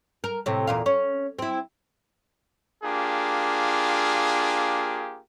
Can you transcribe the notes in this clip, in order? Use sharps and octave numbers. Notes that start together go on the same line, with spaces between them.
A#4
A2 C3
E2 A#2 F5
C#4
C4 E4
A#3 D4 F4 G4 G#4